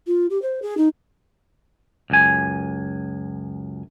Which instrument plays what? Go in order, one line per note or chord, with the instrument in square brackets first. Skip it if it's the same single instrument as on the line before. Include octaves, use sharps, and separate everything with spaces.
[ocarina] F4
G4
C5
G#4
D#4
[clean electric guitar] C#2 F#2 G#5